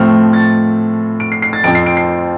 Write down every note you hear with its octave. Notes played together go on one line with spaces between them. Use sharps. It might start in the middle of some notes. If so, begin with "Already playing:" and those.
Already playing: A2 F3 A3 C4 F6
A6
D7
C7
C7
A6
F2 F3 C4 D7
C7
D7
C7